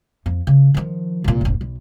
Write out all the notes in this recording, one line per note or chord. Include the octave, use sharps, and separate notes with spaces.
F2
C#3
D#3 F3
C2 A#2
F1 A#1
B1